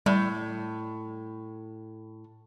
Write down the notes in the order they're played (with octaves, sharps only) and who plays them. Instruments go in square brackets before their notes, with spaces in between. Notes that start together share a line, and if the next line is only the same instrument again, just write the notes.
[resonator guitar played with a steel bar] A2 [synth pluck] G3